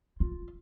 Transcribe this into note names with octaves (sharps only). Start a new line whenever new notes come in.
F4